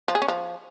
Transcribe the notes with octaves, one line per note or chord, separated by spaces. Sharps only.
F3
G#4
C#4
F3